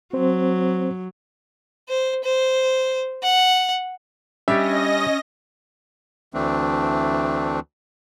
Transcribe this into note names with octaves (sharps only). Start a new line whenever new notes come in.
F#3 C4 C5
C5
C5
F#5
G3 C#4 D4 G4 D#5 E5 A#6
D2 E3 A3 C4 D4